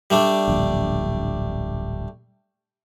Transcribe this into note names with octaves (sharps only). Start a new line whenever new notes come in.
G3 A3 D4
D1 A#1